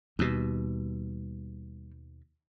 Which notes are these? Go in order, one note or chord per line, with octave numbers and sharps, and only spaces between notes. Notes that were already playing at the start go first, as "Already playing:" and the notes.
D#2 B2 G3